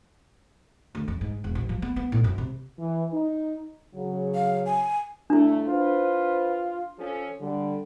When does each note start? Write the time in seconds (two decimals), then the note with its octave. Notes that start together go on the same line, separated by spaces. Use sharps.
0.95 D2
1.08 F2
1.21 G#2
1.44 E1
1.55 A1
1.69 F3
1.82 B3
1.96 B3
2.12 A2
2.24 F#2
2.38 C3
2.78 E3
3.13 D#4
3.94 C#3 F#3
4.35 F5
4.66 G#5
5.30 G2 A3 D4 E4
5.68 F4 B4 C5
6.99 F3 C#4 A4
7.41 D3 G3